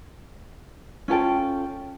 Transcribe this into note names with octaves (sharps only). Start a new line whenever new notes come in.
C#4 F4 A4 G5